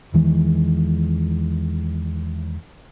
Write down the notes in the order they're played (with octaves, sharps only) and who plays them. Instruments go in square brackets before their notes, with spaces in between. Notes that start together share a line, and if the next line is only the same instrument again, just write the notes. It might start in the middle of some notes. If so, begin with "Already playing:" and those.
[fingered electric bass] E2 D#3 E3 G#3